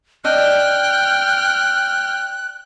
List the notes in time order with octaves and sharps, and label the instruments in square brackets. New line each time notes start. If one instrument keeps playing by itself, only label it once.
[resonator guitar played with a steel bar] D4 D#5 [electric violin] G5 F6 [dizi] F#6